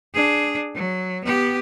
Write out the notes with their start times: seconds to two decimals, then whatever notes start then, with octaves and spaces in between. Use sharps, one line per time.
0.14 D4 G#4
0.75 F#3
1.24 B3 G4